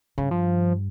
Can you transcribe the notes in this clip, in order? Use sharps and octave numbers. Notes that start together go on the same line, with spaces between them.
G2 C#3
F3